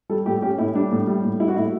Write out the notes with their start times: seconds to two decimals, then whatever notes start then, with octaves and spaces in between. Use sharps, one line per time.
0.10 G3 A4
0.26 A2 G4
0.42 C#4 G4
0.58 A2 E4
0.74 G3 D4
0.91 A2
1.07 G3
1.24 A2
1.40 G3 E4
1.48 F#4
1.57 A2 E4